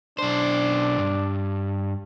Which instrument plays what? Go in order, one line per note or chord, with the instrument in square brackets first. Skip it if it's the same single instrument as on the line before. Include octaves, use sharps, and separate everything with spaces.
[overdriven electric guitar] B1 C5 [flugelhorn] D4
[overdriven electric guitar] G2